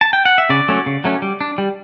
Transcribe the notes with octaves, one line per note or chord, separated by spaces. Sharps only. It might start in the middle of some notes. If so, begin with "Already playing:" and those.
A5
G5
F#5
E5
C#3 D5
F#3 A3 C#4
C#3
F#3 A3 C#4
G3
D4
G3